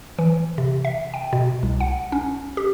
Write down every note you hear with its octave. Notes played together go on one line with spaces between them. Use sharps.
E3
C3
E5
G5
B2
C2
F#5
C#4
G4